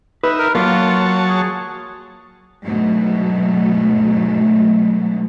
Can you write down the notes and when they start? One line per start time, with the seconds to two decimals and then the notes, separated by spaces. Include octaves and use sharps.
0.23 D#4 B4 E5
0.39 A#4
0.55 F#3 A#3 F4 C#5 A5
1.29 G#4
2.63 D2 G#2 B2 F#3 A3